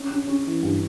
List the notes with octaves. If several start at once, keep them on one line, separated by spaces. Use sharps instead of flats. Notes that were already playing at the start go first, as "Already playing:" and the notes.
Already playing: C#4
C#4
C#4
E3
G2